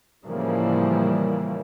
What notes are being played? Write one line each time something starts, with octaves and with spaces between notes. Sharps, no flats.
A2 C#3 E3 F3 G3 A#3